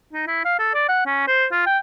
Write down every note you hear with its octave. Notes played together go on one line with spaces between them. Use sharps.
D#4
E4
F5
A4
D5
F#5
C#4
C5
F4
G5